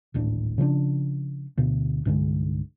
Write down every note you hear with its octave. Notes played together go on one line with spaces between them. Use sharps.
D1 G#1 A2 D4
C#3 F3 C4 D4
D2 B2
C2 G2 D3 G#3